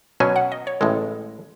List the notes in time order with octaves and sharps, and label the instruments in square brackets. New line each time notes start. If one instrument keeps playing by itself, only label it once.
[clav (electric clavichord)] B2 F#3 C#4 [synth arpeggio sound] G#5
[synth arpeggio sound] F#5
D#5
C#5
[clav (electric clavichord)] A1 A2 G#3 [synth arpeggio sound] A4